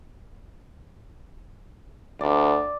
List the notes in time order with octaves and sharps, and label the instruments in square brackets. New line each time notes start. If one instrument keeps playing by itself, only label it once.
[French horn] D2 [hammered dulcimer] D5